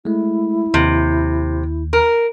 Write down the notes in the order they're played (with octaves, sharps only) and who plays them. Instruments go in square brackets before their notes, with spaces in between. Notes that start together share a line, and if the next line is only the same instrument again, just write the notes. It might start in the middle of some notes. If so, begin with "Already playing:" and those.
[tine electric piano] G#3 A3 [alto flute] E4
[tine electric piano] D#2 [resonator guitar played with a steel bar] C3
[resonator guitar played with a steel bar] A#4